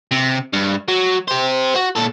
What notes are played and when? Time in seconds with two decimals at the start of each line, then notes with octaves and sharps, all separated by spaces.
0.11 C3
0.53 G2
0.88 F#3
1.28 G4 C5
1.75 F#4
1.95 A#2 A4